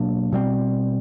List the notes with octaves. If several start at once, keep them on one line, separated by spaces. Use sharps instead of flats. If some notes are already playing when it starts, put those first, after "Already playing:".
Already playing: B2 F#3 A#3 D4
B2 G3 C4